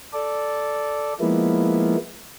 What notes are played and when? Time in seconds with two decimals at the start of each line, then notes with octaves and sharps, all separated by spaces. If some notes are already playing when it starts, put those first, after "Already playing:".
0.13 A4 D5
1.20 F3 G#3 A#3 B3 E4